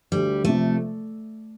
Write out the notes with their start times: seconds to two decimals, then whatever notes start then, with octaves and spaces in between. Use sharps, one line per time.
0.12 D2 G3
0.44 C3 F3 A3